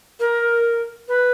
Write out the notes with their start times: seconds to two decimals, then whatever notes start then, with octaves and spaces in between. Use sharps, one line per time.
0.20 A#4
1.08 B4